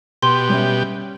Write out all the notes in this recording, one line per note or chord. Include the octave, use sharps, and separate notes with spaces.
B2 G4 C6
G3 C#4 E5